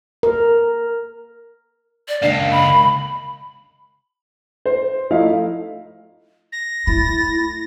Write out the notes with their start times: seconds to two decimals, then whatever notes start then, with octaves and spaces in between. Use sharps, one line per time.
0.23 A#4
2.08 D5
2.22 C#2 A#3 D4
2.51 B5
4.66 C5
5.10 F3 A3 D#4 E4 F5
6.52 A#6
6.87 A3 E4 A6